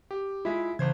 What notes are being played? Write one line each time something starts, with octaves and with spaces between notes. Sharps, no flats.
G4
G#3 E4 F4 E5 B6
G1 C#3 E3 C5 G#6